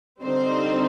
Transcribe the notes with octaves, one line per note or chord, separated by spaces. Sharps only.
D3 G3 C4 D#4 C5